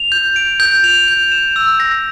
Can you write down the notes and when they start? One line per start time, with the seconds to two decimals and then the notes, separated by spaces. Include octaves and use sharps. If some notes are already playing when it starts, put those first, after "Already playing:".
Already playing: F7
0.12 G6
0.36 D7
0.60 G6
0.84 F7
1.08 G6
1.32 E7
1.56 E6
1.80 A#6